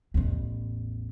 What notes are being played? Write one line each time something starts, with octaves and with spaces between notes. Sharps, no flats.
A1 E2